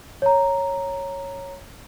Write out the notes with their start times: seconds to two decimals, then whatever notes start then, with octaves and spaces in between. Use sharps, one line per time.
0.22 C#5 A#5